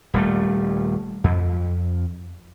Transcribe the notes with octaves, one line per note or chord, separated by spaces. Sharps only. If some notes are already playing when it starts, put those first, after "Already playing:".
D#1 G3 A3
F2